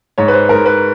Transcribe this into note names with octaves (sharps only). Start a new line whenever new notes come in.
G#2 C#5
B4
C5
G#2 A#4
B4